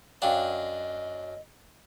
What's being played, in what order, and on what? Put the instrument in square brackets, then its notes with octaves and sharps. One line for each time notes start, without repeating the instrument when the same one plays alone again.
[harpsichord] F#2 D4 [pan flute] D#5 [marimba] F5 G5